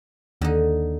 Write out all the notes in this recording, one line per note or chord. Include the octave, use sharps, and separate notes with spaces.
D#2 D3 D#4